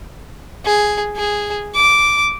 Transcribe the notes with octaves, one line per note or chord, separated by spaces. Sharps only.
G#4
G#4
D6